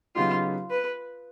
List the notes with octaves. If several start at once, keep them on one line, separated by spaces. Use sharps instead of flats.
C#3 F#3 B3 D#4 F4 G4
B4